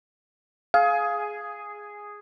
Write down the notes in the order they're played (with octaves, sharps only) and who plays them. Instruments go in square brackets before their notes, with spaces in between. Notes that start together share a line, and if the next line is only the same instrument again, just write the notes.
[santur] G#4 [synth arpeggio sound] F5